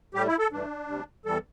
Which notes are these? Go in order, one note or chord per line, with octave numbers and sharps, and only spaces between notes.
A2 G3 G4
E4
A4
G2 E3 A3 D4
D2 C3 G3
E2 E3 G3 A4